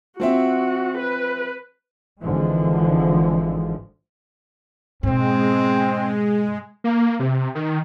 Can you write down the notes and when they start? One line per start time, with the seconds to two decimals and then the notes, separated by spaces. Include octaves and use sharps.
0.20 F3 C4 F#4 E5
0.98 B4
2.21 G#1 D3 E3 F3 G#3
5.03 G#2 B2 G#3 C4
6.84 A#3
7.20 C3
7.55 D#3